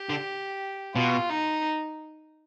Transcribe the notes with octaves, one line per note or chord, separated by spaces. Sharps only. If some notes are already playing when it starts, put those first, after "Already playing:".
Already playing: G4
D3
B2 F4
D#4